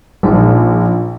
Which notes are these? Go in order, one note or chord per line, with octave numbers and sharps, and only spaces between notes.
A#1 A#2 D#4